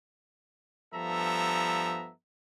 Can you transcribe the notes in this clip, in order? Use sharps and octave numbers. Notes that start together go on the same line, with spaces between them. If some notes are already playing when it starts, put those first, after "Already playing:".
G2 F3 B3 A4 E5 A#5